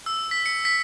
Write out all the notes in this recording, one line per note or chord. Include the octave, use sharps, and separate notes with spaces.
E6
B6
C#7
B6